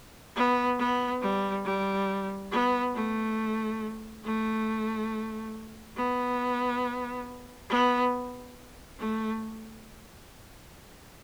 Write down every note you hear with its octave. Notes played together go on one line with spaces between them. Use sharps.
B3
B3
G3
G3
B3
A3
A3
B3
B3
A3